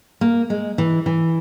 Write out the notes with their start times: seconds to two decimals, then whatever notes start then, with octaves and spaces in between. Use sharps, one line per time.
0.21 A#3
0.50 G#3
0.78 E3
1.06 E3